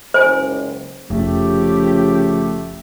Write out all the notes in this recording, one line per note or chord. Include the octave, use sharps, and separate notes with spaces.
F#1 C#2 C5 G#5
F1 C#3 F3 A3 G4